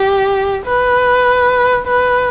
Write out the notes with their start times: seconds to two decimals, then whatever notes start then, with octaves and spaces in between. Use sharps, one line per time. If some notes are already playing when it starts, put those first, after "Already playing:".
Already playing: G4
0.66 B4
1.87 B4